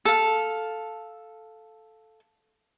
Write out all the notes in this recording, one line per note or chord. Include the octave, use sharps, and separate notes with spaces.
A4 F5